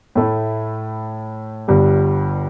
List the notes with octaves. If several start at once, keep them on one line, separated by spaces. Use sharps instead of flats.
A2 A3 E4
G1 G2 G3